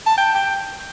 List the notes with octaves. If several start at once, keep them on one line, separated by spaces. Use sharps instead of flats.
A5
G5
G5